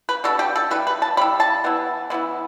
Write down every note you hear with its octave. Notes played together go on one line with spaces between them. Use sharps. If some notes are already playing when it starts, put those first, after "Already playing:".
B4
B2 A3 D4 A4
G4
A4
G3 E4 B4
B4
A5
G3 E4 B5
A5
E3 B3 E4
E3 B3 E4